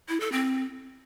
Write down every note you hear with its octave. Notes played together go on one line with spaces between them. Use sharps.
E4
A4
C4